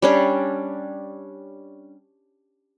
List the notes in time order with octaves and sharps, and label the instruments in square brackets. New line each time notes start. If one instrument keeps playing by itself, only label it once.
[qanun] G3 C#4 D4